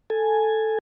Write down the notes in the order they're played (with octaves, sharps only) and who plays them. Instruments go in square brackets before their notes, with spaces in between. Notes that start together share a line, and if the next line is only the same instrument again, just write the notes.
[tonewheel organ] A4 G#5